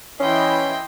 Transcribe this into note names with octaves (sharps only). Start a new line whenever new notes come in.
E3 C#4 E4 D#5 G5 C6